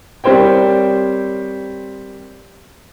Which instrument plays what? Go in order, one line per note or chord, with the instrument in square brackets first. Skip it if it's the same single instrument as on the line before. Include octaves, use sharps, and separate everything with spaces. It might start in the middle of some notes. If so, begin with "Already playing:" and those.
[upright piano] G3 C4 A#4 C5 C#5 G5